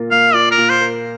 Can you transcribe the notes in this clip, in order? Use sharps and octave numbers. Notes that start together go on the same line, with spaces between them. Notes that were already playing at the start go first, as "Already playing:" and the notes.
Already playing: A#2 A#3 F4 A#4
A#3 F5
F4 D5
A#4
A#2
C5
A#4